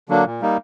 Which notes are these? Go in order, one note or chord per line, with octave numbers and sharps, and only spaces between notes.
D3 F#3 A#3 D4
A#2
G3 A#3 D#4